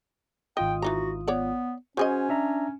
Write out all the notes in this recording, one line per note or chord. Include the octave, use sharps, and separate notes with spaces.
G#1 F4 D#5 G5 D#6
E3 D#4 F#4 A#5
B3 C#5 D5 F#5
C#3 C#4 F#4 G#4 C5 D#5 G#5
D4 E5 A#5